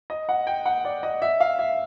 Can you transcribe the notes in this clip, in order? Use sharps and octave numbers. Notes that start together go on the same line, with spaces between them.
D#5
F#5
G5
F#5
D5
D#5
E5
F5
E5